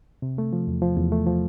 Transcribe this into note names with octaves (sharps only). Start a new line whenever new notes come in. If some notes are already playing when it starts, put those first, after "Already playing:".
C3
A3
F3
E2
F3
E2
A3
F3